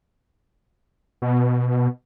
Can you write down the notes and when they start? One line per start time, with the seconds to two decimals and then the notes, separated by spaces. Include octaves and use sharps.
1.22 B2